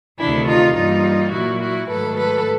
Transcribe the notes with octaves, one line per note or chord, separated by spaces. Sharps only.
D2 C3 D#3 D4 E4
D#4 F4
G2 E3 G3 A#3 D#4 F4
A#2 F#3 A#3 E4 F#4
E4 F#4
G#2 D#3 F#3 A3 A4 B4
A4 B4